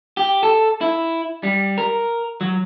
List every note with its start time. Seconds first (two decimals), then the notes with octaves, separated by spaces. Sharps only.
0.17 G4
0.43 A4
0.81 E4
1.43 G3
1.78 A#4
2.41 F#3